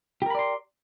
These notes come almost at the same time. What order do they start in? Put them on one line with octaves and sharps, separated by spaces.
G4 A#4 B5 D5 C6